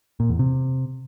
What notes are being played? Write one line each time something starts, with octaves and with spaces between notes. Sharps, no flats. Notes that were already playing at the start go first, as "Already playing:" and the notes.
A#2
E2
C3